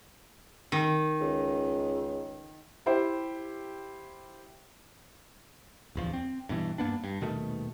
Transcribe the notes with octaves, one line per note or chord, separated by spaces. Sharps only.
D#3
C#2
E4 G4 C5
D1 E2 F3
C4
G2 B2 E3
G2 A#3 B3 D4
G2
D#1 B2 D#3 A3